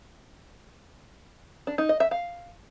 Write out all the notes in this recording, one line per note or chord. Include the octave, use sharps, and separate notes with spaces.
D4
D#4
D#5
E5
F5